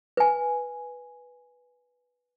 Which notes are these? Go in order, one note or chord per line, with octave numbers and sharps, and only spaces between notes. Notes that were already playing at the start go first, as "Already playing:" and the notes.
B4 G#5